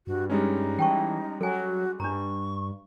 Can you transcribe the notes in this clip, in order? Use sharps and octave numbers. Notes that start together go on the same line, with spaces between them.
G2 F#4
G3 G#3 C#4 D#4
E3 G5 A5 C#6
F#3 F#4 A4 G#5
G2 D4 A#5 C#6